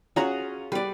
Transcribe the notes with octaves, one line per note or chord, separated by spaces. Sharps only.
C#4 F4 F#4 G#4 F#5 A#5
G3 B4 D5